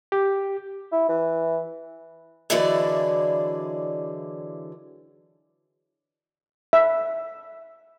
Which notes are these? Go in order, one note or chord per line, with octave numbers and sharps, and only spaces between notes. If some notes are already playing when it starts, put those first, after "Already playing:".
G4
E4
E3
D3 E3 F#3 G#3 E4 D5
E5